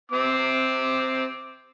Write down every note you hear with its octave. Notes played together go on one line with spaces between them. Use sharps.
C4 D6